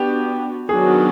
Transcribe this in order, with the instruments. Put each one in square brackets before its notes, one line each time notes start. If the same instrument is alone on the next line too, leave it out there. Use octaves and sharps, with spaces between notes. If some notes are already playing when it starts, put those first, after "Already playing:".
Already playing: [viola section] B3 D4 F#4 [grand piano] G4
[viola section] D#3 F#3 B3 D4 F#4 [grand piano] G#4